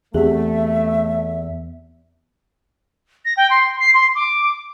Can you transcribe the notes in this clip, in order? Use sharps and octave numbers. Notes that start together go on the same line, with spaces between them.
E2 A3 C4 G4 G#4 E5
A#6
G5
C6
C7
C6
D6